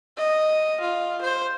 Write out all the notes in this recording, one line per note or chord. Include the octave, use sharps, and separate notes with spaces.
D#5
F4
C5